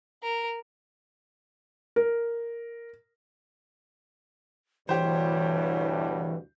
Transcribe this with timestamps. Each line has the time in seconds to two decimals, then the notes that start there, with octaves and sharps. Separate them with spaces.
0.23 A#4
1.96 A#4
4.89 D2 G2 B2 E3 G4 C5 C#5